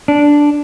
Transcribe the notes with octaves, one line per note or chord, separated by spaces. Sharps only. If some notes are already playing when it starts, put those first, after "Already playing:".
D4